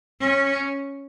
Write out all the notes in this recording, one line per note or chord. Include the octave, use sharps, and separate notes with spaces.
C#4